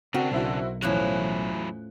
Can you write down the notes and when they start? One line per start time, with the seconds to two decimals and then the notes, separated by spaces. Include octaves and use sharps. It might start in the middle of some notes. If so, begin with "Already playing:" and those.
0.14 C#3 C4 D4 F#4 A#4
0.32 B1 C4 E4 F#4
0.82 E2 A2 F3 F#3 C#4 E4 F#6